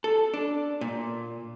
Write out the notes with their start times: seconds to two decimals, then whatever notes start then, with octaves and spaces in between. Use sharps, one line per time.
0.04 A4
0.34 D4
0.81 A#2